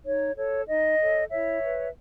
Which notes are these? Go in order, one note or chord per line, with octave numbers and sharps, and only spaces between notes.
D#4 C#5
A4 C#5
D#4 D#5
A4 C#5
E4 C#5 E5
B4